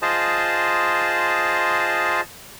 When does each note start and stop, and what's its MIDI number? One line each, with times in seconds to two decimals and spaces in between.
0.02 2.21 65
0.02 2.21 68
0.02 2.21 72
0.02 2.21 75
0.02 2.21 81